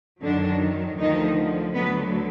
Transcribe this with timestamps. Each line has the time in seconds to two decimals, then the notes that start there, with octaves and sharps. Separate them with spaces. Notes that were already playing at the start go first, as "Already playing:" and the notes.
0.22 F#2 D3 D#3 F#3 D4
0.98 D2 D3 D#3 F3 D#4
1.74 D2 D3 F#3 B3 B4